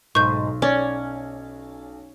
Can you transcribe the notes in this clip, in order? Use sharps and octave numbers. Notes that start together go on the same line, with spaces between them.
B1 G#2 C#6 G6
C#4 D5